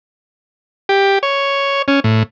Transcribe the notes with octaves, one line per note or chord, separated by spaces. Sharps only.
G4
C#5
C#4
A2